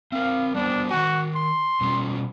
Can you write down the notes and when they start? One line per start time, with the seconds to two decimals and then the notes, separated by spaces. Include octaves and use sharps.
0.12 C4 A#4 F5
0.54 G3 B3 D4 C5
0.90 D#3 F#4 G#5
1.35 C6
1.81 B2 G3 C#4